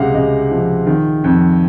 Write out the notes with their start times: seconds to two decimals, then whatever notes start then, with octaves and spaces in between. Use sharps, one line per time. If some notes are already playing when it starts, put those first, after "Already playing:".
Already playing: C#2 C3 F5 F#5
0.15 C#2 D#5
0.51 F3
0.87 D#3
1.24 F2